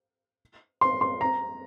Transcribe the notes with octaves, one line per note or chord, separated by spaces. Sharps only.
C6
C6
A#5